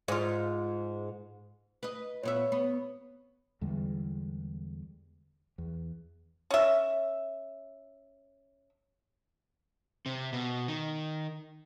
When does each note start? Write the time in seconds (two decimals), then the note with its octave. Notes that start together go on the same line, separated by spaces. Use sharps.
0.08 G#2 F4
1.83 B4 D#5
2.23 A#2 B3 C#5 E5
2.52 B3
3.61 E2 D3 G3 G#3
5.58 E2
6.51 C#4 E5
10.06 C3
10.33 B2
10.68 D#3